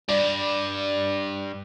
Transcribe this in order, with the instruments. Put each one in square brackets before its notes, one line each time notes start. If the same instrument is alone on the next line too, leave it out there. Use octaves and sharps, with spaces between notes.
[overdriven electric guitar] G2 G3 [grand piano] D5